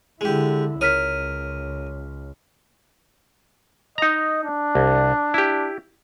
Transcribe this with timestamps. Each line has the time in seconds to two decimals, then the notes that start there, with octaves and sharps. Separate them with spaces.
0.21 D3 G#3 E4 G4
0.81 C#2 A#4 C#5 D#6 F6 B6
3.98 D#4 D#5 A#5
4.44 D4
4.75 C2
5.34 E4 G4